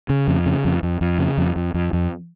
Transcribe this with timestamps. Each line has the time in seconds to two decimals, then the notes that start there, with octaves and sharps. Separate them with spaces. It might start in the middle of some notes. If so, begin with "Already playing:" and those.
0.09 C#3
0.27 F2
0.46 C#3
0.65 F2
0.83 F2
1.01 F2
1.19 C#3
1.38 F2
1.56 F2
1.74 F2
1.93 F2